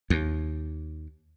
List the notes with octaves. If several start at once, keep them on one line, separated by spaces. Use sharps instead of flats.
D#2